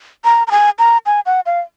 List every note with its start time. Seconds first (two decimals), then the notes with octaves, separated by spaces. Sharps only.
0.25 A#5
0.47 A#5
0.51 G#5
0.79 A#5
1.06 G#5
1.26 F#5
1.46 F5